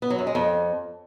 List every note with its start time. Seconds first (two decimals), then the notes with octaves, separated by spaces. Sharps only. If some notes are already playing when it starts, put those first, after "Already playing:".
0.02 B3
0.10 F#3
0.19 F#2
0.27 G#3
0.35 F2